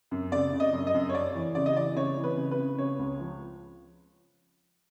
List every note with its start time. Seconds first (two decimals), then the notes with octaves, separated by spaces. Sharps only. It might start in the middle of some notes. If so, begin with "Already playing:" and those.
0.11 F#2
0.32 C#3 D5
0.53 C#3
0.60 D#5
0.73 F#2
0.87 D#5
0.94 F#2
1.09 C#5
1.14 F2 D5
1.35 E3
1.55 C#3 D5
1.66 D#5
1.76 E3 D5
1.96 C#3 C#5
2.17 E3
2.24 B4
2.37 C#3
2.51 B4
2.58 C#3
2.78 C#3 C#5
2.99 C#2
3.20 F3